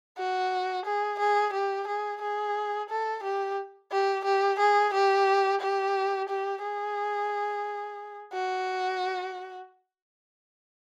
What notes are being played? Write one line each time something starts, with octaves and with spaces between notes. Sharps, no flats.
F#4
G#4
G#4
G4
G#4
G#4
A4
G4
G4
G4
G#4
G4
G4
G4
G#4
F#4